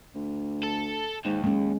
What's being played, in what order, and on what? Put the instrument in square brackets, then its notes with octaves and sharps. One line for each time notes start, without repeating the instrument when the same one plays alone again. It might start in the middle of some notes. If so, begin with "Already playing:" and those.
[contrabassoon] D2
[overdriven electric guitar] A4
[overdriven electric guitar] D#2 [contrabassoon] G#2
[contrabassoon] F#1 [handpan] G#3 C#4